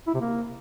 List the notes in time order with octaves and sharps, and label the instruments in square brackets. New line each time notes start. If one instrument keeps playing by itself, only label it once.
[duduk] E4
C3
A#3